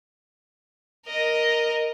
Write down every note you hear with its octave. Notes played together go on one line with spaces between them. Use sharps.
A#4 D#5